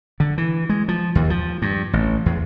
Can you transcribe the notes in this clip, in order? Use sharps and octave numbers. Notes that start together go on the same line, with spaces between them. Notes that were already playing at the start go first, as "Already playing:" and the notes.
D3
E3
G#3
F3
D#2
F3
G2
A1
E2